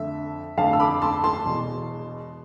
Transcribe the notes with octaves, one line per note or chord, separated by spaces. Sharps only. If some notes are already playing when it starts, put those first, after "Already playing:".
Already playing: F2 D3 A3 E5
F2 D3 A3 F5 A5
E6
B5 D6
A5 C6
A5 C6
E1 E2 B2